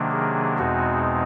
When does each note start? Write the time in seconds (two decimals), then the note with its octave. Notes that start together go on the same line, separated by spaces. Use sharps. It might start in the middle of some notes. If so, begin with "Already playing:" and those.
Already playing: C3 D#3 F#3 A#3 D4
0.11 G#4
0.58 E2 B2 G#3 C4 D#4 F#4